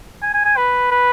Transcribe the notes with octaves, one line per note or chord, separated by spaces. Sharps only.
G#5
G#5
G#5
B4
B4